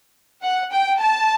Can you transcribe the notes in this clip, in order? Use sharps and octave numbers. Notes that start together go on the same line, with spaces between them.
F#5
G5
A5